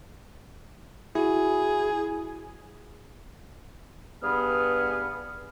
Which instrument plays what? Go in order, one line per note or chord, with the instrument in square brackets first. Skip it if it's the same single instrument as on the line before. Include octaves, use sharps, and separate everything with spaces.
[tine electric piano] E4 F#4 [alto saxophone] G#4
[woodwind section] G2 B3 G#4 F6